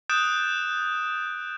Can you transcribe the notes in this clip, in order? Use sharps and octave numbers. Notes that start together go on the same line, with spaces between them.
D#6 F#6 G6 A6 D7 E7